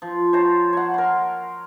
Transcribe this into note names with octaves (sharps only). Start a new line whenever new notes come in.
F3
C5 C#5 A5 A#5
C#5 F#5
A#4 C6